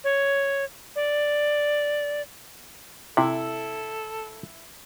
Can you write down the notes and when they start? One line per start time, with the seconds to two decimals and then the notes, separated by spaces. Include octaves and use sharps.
0.04 C#5
0.96 D5
3.17 C3 E4 A4